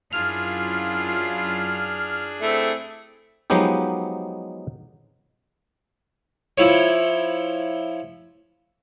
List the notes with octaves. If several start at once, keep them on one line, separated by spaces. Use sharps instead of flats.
F#2 D4 E4 F4 G#4 F6
A3 C4 E4
F3 F#3 G#3 B3 D#4 G4
F3 E4 C#5